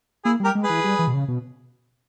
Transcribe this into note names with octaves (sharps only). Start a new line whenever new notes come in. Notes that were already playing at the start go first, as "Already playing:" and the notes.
A#3 E4 G#4
G3 G4 A#4
G#3
G#4 B4
E3
G3
E3
B2
C#3
B2